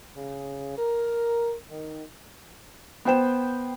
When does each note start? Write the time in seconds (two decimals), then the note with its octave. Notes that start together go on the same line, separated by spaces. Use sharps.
0.15 C#3
0.77 A#4
1.69 D#3
3.05 B3 C5 G5 E7